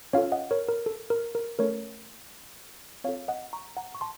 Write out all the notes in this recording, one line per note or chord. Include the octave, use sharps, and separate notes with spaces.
C#4 F4 A4 C#5 F5
D#5 F#5
A#4 C#5
A#4
A4
A#4
A#4
A3 C#4 A4 A#4 C#5
C4 F4 A4 C#5 F5
D#5 F#5
A#5 C#6
F#5 A#5
C#6
A5 C6